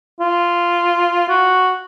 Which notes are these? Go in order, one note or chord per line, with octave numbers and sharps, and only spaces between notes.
F4
F#4